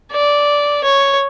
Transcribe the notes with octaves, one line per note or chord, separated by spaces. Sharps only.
D5
C#5